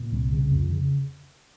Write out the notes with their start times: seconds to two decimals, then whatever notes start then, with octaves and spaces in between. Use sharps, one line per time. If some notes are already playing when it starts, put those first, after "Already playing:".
Already playing: A#2
0.12 C2
0.32 C#3
0.51 F2
0.71 C#3